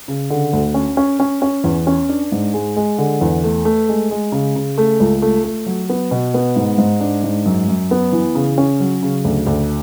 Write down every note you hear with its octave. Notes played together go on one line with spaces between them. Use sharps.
C#3
D3
D2
C#4
C#4
C#4
C#4
E2
C#4
D4
G#2
G#3
G#3
D3
E2
A3
A3
G#3
G#3
C#3
C#3
A3
C#2
A3
A3
F#3
B3
B2
B3
G#2
G#2
D4
G#2
F#2
F#2
B3
E3
C#3
C#4
F#3
C#3
D2
D2